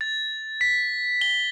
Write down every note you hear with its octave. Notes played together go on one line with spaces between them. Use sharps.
A6
B6
G7